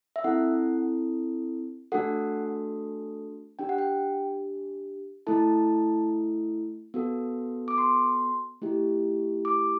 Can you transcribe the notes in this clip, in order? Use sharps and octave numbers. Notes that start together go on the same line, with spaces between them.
E5
C4 E4 A4 F#5
A3 D4 F#4 A4 F#5
D4 G4 G5
F#5
G5
A3 E4 A4 A5
B3 F#4 A4
D6
C6
A3 E4 G4
D6